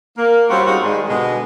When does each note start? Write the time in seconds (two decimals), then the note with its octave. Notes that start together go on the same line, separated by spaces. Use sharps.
0.18 A#3
0.50 G3 C4 C#4 F4 F#4
0.66 G3 G#3 D#4 F4 F#4
0.84 G#2 D#3 G3 G#3
1.08 B2 D3 G#3